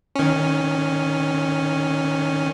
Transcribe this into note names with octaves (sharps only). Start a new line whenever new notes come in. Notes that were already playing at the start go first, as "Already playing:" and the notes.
D#3 C#4